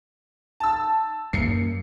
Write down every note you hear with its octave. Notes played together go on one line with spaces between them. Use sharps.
A5 E6
F#2 A#3 C7 C#7